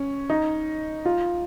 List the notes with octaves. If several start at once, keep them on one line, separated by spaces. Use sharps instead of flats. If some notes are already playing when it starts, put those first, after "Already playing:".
Already playing: C#4
D#4
F4